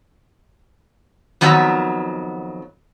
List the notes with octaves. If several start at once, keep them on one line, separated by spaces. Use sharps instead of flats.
F2 D#3 F#3 B3 E5 A#5